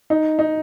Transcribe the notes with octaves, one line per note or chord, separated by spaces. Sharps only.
D#4
D#4